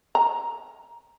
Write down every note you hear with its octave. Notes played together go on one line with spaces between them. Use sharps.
A#5